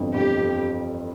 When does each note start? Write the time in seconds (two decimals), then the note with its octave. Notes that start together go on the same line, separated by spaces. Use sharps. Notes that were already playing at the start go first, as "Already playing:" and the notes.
Already playing: G1 F2 E3
0.14 G1 G4
0.37 F2